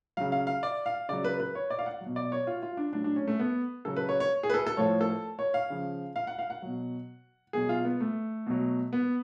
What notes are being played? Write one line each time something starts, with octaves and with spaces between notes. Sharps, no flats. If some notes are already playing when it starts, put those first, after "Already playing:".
C#3 F#3 F5
F5
F5
D5
F5
C#3 F#3 D5
B4
B4
C#5
D5
F5
F#5
F#3
B2
D5
C#5
F4
F4
D4
A2 F#3 D4
D4
C#4
A3
B3
C#3 F#3 A4
B4
C#5
C#5
G#4
B4
A4
A4
A2 F3 C#5
A4
C#5
F5
C#3 F3
F5
F#5
F5
F#5
B2 F#3
B2 F#3 G#4
F4
B3
A3
B2 F#3
B3